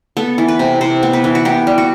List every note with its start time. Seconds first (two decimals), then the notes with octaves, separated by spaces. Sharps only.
0.17 B3 A4
0.38 E3
0.48 B4
0.59 C3
0.81 C3 C5
1.03 B3
1.13 B4
1.24 E3
1.35 F#4
1.45 B3 G4
1.67 G3
1.78 F#4